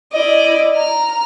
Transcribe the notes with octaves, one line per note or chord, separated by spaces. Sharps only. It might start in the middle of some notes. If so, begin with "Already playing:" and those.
E4 D5 D#5
A#5 F6